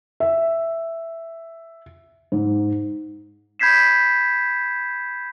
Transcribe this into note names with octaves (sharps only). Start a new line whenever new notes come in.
E5
G#2
B5 G6 G#6 B6 C7 E7